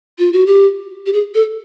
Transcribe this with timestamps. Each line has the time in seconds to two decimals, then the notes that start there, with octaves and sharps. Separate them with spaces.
0.19 F4
0.33 F#4
0.46 G4
1.06 G4
1.13 G#4
1.35 A4